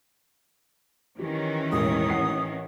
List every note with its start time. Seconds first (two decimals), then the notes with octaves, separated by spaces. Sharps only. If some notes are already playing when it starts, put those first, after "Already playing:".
1.19 D#3 E3 C#4 G4
1.72 E1 A1 A#4 D#6
2.10 A1 F#5 C7